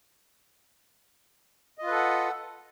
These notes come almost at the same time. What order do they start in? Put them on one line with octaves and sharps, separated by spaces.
D#5 F4 B4 A4 F#5